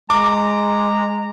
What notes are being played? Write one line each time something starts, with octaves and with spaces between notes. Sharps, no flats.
G#3 A#5 D6